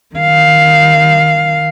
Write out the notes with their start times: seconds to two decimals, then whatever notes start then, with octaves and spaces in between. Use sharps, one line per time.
0.16 D#3 F5